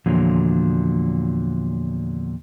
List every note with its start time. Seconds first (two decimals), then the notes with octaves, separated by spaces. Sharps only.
0.06 E2 A#2 D3 F3 F#3